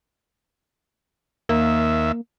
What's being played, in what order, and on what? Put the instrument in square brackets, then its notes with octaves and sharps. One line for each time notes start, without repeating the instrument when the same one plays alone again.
[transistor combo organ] D#2 E5 [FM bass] A#3